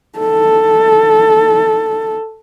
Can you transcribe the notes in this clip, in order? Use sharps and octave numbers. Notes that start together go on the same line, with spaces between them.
A4